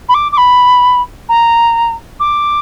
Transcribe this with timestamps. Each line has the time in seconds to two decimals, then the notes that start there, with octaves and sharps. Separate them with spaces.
0.09 B5
0.14 D6
0.32 D6
0.37 B5
1.29 A#5
2.20 D6